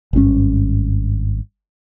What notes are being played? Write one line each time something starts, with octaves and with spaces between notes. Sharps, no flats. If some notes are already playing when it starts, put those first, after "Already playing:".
G#1 G2 C4 C#4